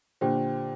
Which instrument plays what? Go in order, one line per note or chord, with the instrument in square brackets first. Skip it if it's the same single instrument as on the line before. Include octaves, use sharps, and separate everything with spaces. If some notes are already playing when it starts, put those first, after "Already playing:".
[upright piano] A#2 D3 [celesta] G4 C5 G5